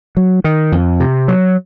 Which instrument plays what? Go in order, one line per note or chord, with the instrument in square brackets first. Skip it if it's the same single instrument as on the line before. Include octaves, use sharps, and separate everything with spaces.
[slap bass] F#3
D#3
F2
C3
F#3